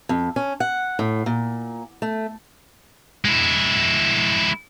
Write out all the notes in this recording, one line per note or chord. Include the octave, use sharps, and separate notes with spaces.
F2
C#4
F#5
A2
A#2
A3
G#3 E4